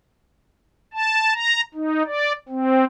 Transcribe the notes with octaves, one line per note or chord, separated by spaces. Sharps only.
A5
A#5
D#4
D5
C4